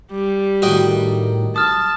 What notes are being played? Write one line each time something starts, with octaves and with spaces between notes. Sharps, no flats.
G3
A2 D#3 F#4 D#5 G5
A5 D#6 F6